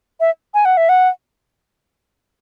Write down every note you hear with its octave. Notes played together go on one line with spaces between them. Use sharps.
E5
G#5
F#5
E5
F#5